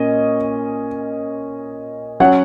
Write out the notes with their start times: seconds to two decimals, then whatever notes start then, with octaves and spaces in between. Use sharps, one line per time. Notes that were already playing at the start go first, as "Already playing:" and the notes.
Already playing: A#2 A#3 C#4 D#5
2.20 F#3 C#4 C#5 F#5